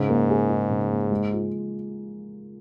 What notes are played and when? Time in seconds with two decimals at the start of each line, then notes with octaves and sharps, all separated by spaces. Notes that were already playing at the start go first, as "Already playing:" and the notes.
Already playing: G#2 C#3
0.09 A#3
0.30 G#4
0.50 D#4
0.70 C#3
0.91 A#3
1.11 G#3
1.32 F4